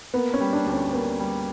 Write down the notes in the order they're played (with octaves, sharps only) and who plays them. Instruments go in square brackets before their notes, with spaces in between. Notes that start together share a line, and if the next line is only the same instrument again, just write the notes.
[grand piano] A#3 [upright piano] B3
[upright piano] C#4
[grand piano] G3
[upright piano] D4
[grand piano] D2
[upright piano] C#4
[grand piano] A#3 [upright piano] B3
[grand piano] G3